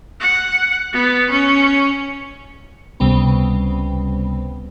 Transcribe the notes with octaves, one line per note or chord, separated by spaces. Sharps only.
F#5
B3
C#4
C#2 C3 G3 B3